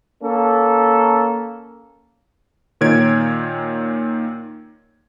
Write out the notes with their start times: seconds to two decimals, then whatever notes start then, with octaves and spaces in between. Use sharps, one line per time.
0.23 A#3 C#4 A4
2.81 A#2 D#3 C#5 G#6 D7